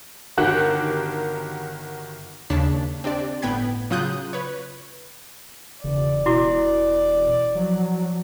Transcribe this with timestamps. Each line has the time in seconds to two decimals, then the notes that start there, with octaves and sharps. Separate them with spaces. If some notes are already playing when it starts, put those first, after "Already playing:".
0.37 G1 D#3 F#4 G4 A#4 F#6
2.50 D#2 C#3 D4 C#5 A5 B6
3.04 C4 D4 G4 D5
3.42 G1 A2 B3 G5 B5 G#6
3.90 C#3 F#3 F4 D#6 F#6 G6
4.33 B4 C#5
5.84 E1 C#3 D5
6.26 B2 E4 F#4 D6
7.55 F3 F#3